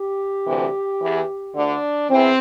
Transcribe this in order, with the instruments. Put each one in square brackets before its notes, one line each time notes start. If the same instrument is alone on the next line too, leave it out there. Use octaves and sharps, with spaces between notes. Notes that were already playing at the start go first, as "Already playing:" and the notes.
Already playing: [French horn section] G4
D2 C3 E3
E2 E3
D2 D3 D4
E2 E3 C4